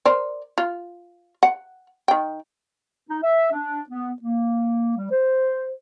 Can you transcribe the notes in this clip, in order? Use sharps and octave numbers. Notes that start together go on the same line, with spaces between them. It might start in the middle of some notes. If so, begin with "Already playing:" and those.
A#4 C5 D5
F4
F#5
D#3 G5
D#4
E5
D4
B3
A#3
G3
C5